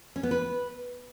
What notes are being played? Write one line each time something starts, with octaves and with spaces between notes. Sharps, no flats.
C#4
B3
B4